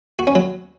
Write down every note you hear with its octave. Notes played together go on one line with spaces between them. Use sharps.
F#4
C#4
F#3